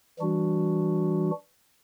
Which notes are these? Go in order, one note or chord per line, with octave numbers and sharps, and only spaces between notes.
E3 G3 D4 F#4